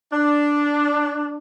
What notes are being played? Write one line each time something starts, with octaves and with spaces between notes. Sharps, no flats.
D4